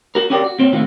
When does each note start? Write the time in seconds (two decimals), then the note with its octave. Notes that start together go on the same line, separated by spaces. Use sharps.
0.15 F#4 A#4
0.30 C#4 F#4 G4 A#4 C5 D5
0.44 F#4
0.59 A#2 C4 C#4
0.73 A2 C3 D#3 A3 F4 F#4